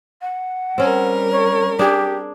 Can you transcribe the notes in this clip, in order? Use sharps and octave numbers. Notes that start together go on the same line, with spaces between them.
F#5
G3 C4 C#4 A#4
C#5
D4 G4 G#4